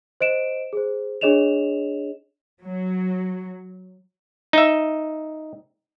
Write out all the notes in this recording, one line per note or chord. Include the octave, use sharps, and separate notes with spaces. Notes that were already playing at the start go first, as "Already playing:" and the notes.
C5 D#5 D7 E7
G#4 C5
D4 G#4 C#5 D#5 E7 F7
F#3
D#4 E5